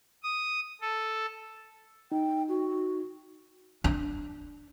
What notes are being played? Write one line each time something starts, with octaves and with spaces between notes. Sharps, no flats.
D#6
A4
D#4 G5
F#4
D4